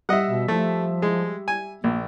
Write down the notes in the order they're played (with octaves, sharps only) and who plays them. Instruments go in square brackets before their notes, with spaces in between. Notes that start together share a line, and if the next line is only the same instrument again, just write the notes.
[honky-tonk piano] G3 E5 [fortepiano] D#5 F#5
[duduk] B2
[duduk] F3 [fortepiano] A3
[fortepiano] G#3
G#5
[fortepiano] A#1 [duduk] A#3